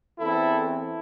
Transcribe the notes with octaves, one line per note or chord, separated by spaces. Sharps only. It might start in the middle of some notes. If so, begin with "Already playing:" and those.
E2 E3 C4 E4 A4
E4 A4